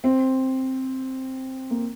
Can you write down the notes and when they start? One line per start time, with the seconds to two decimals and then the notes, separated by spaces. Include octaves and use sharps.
0.04 C4
1.71 A#3